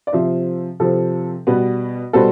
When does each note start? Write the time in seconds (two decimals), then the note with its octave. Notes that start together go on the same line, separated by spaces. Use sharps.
0.07 D5
0.12 C3 F3 C4 C5 E5
0.80 C3 F3 C4 A4
1.47 B2 G3 B3 B4
2.13 B2 G3 B3 A4 C5